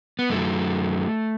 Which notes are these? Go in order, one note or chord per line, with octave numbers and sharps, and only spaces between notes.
B3
F#2 F#3 A3